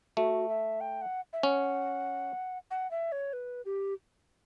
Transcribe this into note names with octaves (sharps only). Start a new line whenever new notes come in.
A3 F#4
E5
G5
F#5
E5
C#4 F#5
F#5
E5
C#5
B4
G4